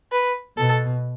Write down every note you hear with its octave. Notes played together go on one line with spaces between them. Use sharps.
B4
B2 A4